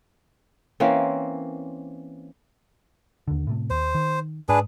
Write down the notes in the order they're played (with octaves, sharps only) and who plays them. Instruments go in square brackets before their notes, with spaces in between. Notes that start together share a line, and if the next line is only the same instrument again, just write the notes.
[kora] E3 A#3 C4 C#4
[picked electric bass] D#2 D3
A2 C3 A3
[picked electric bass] D#2 [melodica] C5
[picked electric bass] D#3
[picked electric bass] G#2 [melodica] D4 G#4 B4